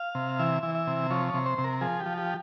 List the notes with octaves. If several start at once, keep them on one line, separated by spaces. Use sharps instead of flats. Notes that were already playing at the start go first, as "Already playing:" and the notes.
Already playing: F5
C3
E3 E5
E3
E5
C3
F3 C#5
C#5
C3
C5
C3
A#4
F3 G#4
G4
F3
G4